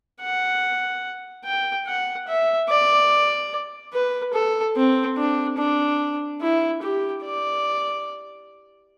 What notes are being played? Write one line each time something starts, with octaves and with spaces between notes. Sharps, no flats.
F#5
G5
F#5
E5
D5
B4
A4
C4
D4
D4
E4
G4
D5